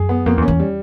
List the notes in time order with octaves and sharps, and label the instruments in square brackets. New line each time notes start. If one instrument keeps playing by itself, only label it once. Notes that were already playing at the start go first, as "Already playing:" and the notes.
Already playing: [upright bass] F#2 [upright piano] G#4
[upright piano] B3
[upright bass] F2 [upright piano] A#3
[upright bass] E2
[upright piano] C#4
[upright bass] E2
[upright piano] G3